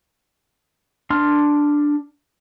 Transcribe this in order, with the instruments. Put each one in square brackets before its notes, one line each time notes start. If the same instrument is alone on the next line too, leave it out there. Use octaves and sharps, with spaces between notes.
[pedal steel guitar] D4 C6 F6